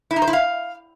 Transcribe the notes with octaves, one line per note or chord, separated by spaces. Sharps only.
E4
D#4
C5
E4
F5